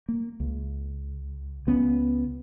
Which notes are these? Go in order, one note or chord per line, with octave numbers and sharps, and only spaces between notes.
A#3
C#2
C#2 B3 C#4